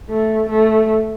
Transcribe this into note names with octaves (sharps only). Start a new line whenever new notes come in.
A3
A3